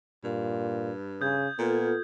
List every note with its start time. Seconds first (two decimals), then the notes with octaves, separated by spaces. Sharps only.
0.24 G2 A#2
1.21 C#3 D#6 G6 G#6
1.59 A#2 B3 F4 A4